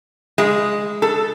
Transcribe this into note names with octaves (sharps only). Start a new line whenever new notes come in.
G#3
A4